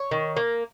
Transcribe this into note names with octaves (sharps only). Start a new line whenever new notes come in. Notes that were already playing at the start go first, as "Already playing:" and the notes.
Already playing: C#5
D#3
A#3